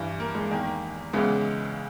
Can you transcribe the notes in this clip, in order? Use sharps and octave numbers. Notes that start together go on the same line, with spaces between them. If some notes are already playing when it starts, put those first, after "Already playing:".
Already playing: G2 E3
A#3
G#3
E2 D#3 A#3
C#2 C#3 E3 G#3 B3